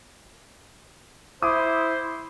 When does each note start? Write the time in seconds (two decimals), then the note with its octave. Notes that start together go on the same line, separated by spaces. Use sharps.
1.42 E4 C5 D6 D#6